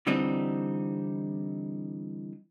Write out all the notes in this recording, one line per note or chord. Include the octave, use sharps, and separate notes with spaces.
D3 E3 G3 C4 D#4